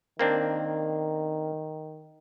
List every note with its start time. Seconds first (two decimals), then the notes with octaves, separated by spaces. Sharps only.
0.19 D#3 A#3 C4 D4